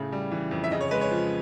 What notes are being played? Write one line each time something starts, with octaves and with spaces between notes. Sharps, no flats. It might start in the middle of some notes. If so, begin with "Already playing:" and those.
Already playing: A2 C#3
G3
E3
F2
E5
C#3 D#5
C#5
G#3 B4
C#5
F3